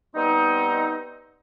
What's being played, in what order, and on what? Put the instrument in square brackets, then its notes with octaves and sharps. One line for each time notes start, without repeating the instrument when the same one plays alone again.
[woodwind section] G3 B3 C4 D#4